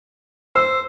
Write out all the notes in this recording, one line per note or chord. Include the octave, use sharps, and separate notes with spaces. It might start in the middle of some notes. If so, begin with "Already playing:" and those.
C5 E6